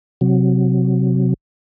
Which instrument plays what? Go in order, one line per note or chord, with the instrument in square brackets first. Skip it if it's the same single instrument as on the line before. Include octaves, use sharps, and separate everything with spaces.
[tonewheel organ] C3 F#3